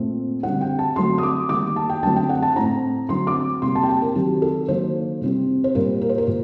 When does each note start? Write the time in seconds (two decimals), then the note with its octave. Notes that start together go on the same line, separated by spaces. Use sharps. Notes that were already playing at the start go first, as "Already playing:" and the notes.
Already playing: A#2 A3 C4
0.43 D3 G3 C4 F#5
0.61 G5
0.79 A5
0.96 D3 F#3 A3 C4 C6
1.18 D#6
1.23 D6
1.49 D#3 G3 A#3 D6
1.76 A5
1.90 G5
2.03 D3 F#3 A3 C4 A5
2.16 G5
2.29 F#5
2.42 A5
2.56 A2 A3 C4 A#5
3.09 D3 F#3 C4 C6
3.27 D6
3.62 C3 G3 A#3 C6
3.75 A5
3.83 G5
3.89 A5
4.02 A#4
4.15 D#3 F#3 C4 G4
4.42 A4
4.68 D#3 F#3 A#3 C5
5.21 C3 G3 C4
5.64 C5
5.75 A#2 G3 A#3 A#4
6.01 A#4
6.09 C5
6.18 A#4
6.28 A#2